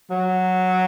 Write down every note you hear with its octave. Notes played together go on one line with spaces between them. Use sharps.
F#3